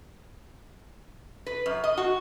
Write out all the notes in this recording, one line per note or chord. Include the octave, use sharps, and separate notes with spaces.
B4
F#2
D#5
F#4